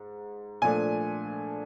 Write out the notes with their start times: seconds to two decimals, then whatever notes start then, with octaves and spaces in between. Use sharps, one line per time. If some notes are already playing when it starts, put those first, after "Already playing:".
Already playing: G#2
0.62 A#2 F3 A3 D4 G#5